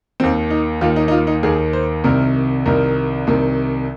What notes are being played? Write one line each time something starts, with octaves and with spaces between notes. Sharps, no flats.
D#2 D#3 C4
D#4
D#2 D#3 F4
D#4
D#4
F4
D#4
D#2 D#3 G#4
C5
C2 C3 D#3 A#4
C2 C3 D#3 A#4
C2 C3 D#3